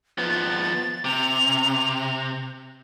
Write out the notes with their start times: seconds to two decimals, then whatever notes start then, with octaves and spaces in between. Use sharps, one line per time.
0.18 F3 B3 A6
1.04 C3 F7